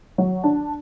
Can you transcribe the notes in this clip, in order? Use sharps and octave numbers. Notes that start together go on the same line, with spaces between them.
F#3
D4